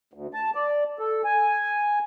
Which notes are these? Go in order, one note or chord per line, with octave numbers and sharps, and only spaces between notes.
D2
A5
D5
A4
G#5